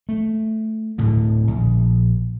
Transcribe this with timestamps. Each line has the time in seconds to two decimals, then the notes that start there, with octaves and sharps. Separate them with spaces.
0.09 A3
0.98 D1 A2 D3
1.47 A#1